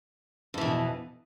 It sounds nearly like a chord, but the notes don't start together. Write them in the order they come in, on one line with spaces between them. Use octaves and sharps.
F2 E3 B2